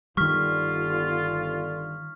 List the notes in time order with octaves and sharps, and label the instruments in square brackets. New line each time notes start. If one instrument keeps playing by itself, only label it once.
[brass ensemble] G1 D3 F4 [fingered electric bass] D#3 G3 [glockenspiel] C#6 F6 B6